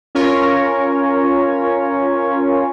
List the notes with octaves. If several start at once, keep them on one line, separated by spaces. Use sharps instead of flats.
C#4 F4 A#4 C#5